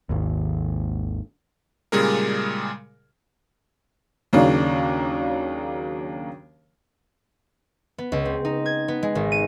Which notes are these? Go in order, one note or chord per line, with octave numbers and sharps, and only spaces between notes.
G#1 D#2
A#2 C#3 G3 G#3 G#4 A#4
D#2 C#3 F#3 A#3 D4
B3
C#2
C4
D#4
G#6
B3
G#3
G#1
D#7